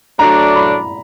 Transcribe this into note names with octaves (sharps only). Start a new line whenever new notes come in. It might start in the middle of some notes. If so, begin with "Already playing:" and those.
F#3 A3 D4 A#5
B5